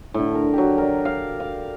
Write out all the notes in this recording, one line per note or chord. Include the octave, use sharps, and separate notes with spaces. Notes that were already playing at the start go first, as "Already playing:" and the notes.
A2 D3
A#4
F#3 G4
A#4 D5
F5
F5